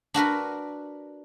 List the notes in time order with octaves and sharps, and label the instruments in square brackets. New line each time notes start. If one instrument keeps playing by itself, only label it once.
[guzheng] D4 F#4 A#4 B4